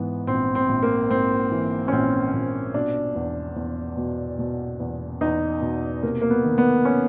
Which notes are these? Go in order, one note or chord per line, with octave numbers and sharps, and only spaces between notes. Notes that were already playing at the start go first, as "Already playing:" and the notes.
Already playing: G#2 E3 B3
A#1 C4
C4
A#1
A#3
G#2 C4
E3
C#4
A#1 C4
A#1
B2 D4
E2
E2
B2
B2
E2
E2 D#4
B2
C3 A#3
A#3
B3
D#3
B3
C#4